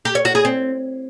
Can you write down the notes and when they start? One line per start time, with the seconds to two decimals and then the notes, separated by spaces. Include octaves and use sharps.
0.05 G4
0.15 C#5
0.25 F#4
0.35 G#4
0.45 C4